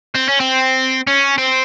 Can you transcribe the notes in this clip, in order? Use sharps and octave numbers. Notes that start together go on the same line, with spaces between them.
C4
C#4
C4
C#4
C4